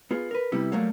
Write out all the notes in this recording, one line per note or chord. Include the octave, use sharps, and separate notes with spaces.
B3 F4 G#4
A#4 B4
C3 G3 B3 E4 G4
F#3 G3 A3 A#3 C#5 F5